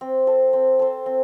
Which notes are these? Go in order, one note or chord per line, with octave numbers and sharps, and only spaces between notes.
C4
A4 C5
C4
A4 C5
C4